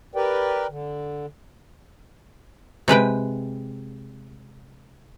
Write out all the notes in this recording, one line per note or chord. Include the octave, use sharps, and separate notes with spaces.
G4 A#4 B4 D5 G5
D3
C3 G#3 B4 G5